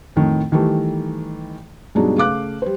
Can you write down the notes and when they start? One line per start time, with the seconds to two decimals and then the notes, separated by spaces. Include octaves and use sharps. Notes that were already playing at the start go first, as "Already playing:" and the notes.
0.16 F2 A2 D#3 A3
0.52 D#3 E3 G3 A3
1.95 G2 B2 F#3 G#3 D4 D#4
2.16 C#3 A3 F5 D6 F#6
2.62 G3 C5